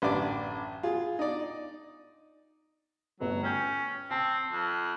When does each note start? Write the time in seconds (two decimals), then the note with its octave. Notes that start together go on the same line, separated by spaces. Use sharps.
0.02 A1 F#2 D3 D5 D6
0.83 F4 G#4
1.19 D#4 D5
3.20 G1 F#3 A3 B4
3.43 C#4 G5 C#6 G6
4.10 C4 G5 A5
4.52 F2